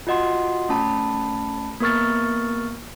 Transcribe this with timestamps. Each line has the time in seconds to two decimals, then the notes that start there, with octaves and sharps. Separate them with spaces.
0.07 F4 F#4 D#5 F#5 C6
0.69 A3 C#4 A5 B5
1.80 A#3 B3 A#4 C#6 F6 A6